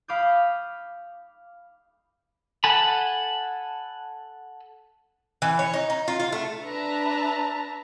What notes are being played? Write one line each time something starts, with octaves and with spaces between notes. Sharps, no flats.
F5 B5 D6 D#6 G6
A4 F#5 G#5 A5 B5
E3
C#5
D#4
D#4
F4
F4
A3
D4 B4 E5 A5 A#5